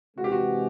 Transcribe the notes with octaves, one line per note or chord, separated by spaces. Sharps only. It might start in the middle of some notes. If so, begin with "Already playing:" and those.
C3 E3 G#3 F#4
G4
F#4